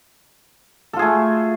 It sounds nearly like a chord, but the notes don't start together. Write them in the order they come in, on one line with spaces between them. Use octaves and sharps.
A4 F4 G#4 A3